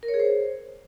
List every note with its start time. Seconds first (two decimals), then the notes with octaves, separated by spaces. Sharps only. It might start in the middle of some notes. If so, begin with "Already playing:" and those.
0.03 A#4
0.08 C#5
0.14 G#4
0.20 C5